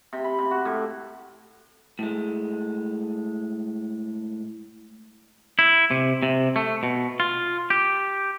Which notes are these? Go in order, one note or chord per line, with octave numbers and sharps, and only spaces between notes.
C3
B5
C3
F#4
A2
A2 G#3
E4
C3
C3
A3
B2
F4
G4